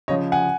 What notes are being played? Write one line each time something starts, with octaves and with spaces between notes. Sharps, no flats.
C#3 F3 C#5 D#5
F#5 G#5